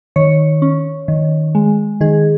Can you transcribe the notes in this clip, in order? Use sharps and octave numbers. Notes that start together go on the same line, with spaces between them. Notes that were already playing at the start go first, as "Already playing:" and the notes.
D#3 C#5
C#4
D#3
G#3
D#3 G#4